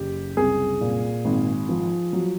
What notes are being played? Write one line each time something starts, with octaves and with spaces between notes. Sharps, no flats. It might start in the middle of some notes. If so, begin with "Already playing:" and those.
Already playing: F#1 G4
C2 G#4
A#2
G#1
F3
F#3